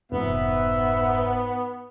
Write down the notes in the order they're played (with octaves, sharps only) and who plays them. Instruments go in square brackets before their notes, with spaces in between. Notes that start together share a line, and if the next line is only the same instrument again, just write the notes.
[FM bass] F1 [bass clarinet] G#2 [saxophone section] B3 [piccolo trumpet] E5